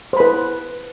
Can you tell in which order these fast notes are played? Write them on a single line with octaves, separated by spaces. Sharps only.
C5 B5 B4